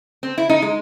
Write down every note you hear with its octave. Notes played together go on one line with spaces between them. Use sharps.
C4
E4
D#4
G#3